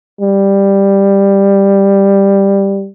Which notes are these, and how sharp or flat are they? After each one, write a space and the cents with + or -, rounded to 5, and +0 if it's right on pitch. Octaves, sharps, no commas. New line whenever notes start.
G3 +10